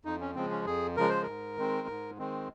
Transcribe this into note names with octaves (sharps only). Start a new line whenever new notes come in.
F2 D#4
C#4
C#3 F3 G#3 C4
C#4
F2 G#4
C#3 F3 G#3 A#4
C5
G#2 A#4
D#3 G#3 C4
G#2
D#3 G#3 C4